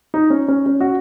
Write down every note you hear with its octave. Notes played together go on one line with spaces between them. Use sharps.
D#4
C#4
C#4
C#4
F#4